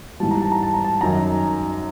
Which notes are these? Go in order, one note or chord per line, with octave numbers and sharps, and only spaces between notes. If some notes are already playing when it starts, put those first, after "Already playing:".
G#2 E3 G3 A5
A#5
A5
A#5
A5
A#5
A5
F#2 D#3 F#3 A#5